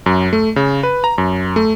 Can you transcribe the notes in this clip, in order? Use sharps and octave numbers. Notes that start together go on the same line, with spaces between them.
F#2
A3
C#3
B4
A#5
F#2
A3